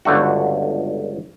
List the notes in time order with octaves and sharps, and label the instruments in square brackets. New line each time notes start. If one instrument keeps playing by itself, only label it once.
[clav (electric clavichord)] G1 C#2 D3 A3 F#4